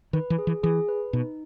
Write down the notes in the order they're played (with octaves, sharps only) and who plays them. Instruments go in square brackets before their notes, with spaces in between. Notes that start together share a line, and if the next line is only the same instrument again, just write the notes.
[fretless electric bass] D#3 [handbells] B4
[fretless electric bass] E3
[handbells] G#4
[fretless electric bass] E3
[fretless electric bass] E3 [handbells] G#4
[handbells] B4
[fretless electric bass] B2 [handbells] D#4